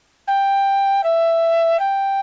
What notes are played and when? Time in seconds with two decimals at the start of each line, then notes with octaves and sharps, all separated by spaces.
0.28 G5
1.04 E5
1.79 G5